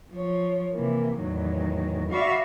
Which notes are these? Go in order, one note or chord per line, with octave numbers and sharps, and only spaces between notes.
F3 C#5
C3 E3 A#3
E2 A2 D#3 F#3
F#4 D5 E5 F5 B5 C#6